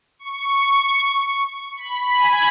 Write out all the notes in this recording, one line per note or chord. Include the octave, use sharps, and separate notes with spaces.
C#6
C#6
B5
G#5